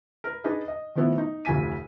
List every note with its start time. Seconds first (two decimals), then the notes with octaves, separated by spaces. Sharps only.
0.24 A#4 B4
0.44 D4 D#4 G#4 B4 D#5
0.68 D#5
0.95 D#3 F3 A3 B3 E4
1.18 D#4
1.45 F1 D2 F4 G#5 B6 D#7